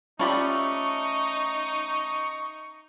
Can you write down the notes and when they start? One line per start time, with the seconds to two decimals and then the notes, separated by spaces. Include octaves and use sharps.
0.19 A3 C#4 D#4 F4 G4 D5 B5 C#6